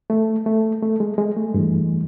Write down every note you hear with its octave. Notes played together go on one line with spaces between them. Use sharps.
A3
A3
A3
G#3
G#3
A3
G2 E3